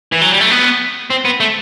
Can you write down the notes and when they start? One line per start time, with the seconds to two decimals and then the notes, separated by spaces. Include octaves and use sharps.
0.12 E3
0.21 F#3
0.31 G3
0.40 A3
0.50 B3
1.10 C4
1.25 B3
1.40 A3